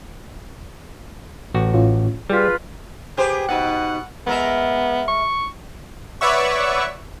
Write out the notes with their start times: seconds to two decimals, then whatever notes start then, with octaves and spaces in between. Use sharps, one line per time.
1.54 A1 F#4
1.74 A2 C#4 F4
2.30 G3 F4 G#4 B4 B6
3.17 G4 G#4 B4 C5
3.49 B2 D#4 F#5
4.27 G#3 B3 A#4 E5
5.08 C#6
6.21 B4 C#5 D5 E5 F#5 C#6